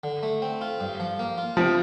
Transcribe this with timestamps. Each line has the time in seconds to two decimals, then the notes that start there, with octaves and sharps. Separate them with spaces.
0.04 D3
0.23 A3
0.42 C4
0.61 F4
0.80 G2
1.00 F3
1.19 A#3
1.38 F4
1.57 C3 F3